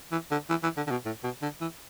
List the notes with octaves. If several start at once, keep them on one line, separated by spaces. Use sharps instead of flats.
E3
D3
E3
E3
D3
D3
B2
A2
B2
D3
E3